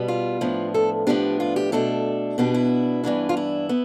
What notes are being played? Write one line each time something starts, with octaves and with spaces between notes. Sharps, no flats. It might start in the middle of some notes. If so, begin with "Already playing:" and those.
Already playing: B2 G3 B3
F4
A2 F3 B3 D4
A4
A2 F3 B3 D4 G4
F4
G4
B2 A3 D4 A4
B2 B3 D4 G4
E4
G2 E3 B3 D4
F4
E4
B3